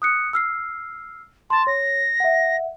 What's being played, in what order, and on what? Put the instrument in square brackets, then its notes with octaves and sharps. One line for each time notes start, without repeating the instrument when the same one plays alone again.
[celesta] D#6 F#6 C#7
E6 F6 C7
[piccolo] A5 [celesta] C6 A6
[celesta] C#5 [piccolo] A#6
[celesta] E5 F#5